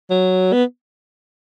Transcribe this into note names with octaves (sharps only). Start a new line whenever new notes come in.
F#3
B3